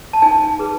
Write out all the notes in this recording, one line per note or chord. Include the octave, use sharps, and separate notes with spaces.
A5
D#4 G#5
G#4 B4